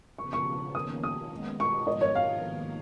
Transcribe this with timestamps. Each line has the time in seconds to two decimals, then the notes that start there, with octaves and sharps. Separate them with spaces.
0.18 C#3 F3 B3 C#6
0.33 C#6
0.75 D#3 A#3 C#4 D#6
1.03 D#6
1.31 D#3 G#3 B3 D#4
1.60 C#6
1.87 G#2 F3 B3 F4 A#4 D#5
2.01 C#5
2.15 F5
2.43 G#2 D#3 A#3